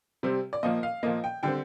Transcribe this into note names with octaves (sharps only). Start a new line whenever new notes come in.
C3 G3 C4
D5
A#2 F3 A#3 D#5
F5
A#2 F3 A#3 D#5
G5
D3 G3 C4 G5